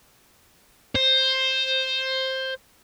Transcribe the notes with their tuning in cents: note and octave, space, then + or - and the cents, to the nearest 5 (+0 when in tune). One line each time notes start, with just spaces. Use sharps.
C5 +10